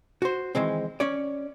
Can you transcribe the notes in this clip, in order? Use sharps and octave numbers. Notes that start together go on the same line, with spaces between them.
F#4 C5
D#3 E3 G#3 C4
C#4 C#5 D5